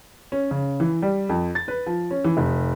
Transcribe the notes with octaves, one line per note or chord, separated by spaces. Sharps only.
C#4
C#3
E3
G3
F2
A6
B4
F3
C#4
E3
F1